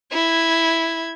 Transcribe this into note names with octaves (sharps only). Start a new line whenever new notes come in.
E4 G#6